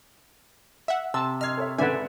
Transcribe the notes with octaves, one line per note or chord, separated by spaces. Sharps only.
E5 F#5
C3 A5 E6
D#5 F6 G#6 C7
A4 C#5 E5
G#1 C#3 A4 B4 D5 E5 F#5 G#5